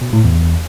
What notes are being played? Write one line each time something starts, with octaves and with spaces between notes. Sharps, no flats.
B2
A2
E2